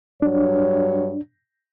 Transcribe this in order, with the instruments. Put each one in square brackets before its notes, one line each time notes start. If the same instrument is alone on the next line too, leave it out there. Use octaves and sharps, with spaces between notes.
[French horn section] G2 F#3 C#5 [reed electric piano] D4